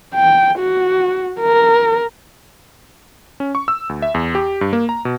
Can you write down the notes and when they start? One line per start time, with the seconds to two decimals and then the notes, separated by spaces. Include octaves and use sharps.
0.15 G5
0.59 F#4
1.40 A#4
3.40 C#4
3.55 C#6
3.68 E6
3.89 D2
4.02 E5
4.14 E2
4.35 G4
4.61 G2
4.73 A#3
4.89 A#5
5.05 B2